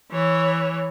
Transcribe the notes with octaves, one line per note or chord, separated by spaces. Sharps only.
E3 C#5